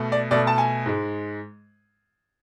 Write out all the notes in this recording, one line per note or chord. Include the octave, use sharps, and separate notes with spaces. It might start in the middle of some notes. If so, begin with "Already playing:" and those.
Already playing: B2 A3
D5
B2 A3 D5
A5
G#5
G#2 G#3